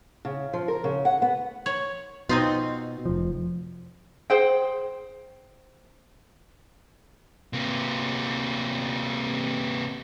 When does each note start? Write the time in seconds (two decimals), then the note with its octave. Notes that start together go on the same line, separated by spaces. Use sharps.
0.25 C#3
0.53 F3
0.68 A#4
0.84 C#3
1.05 F#5
1.22 B3
1.66 C#5
2.29 B2 C4 D#4 F4
3.05 F1 F3
4.30 G#4 C5 G5
7.53 C3 A#3